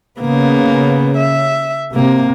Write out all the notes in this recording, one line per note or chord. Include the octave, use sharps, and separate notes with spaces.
C#3 A#3 B3
E5
C3 A#3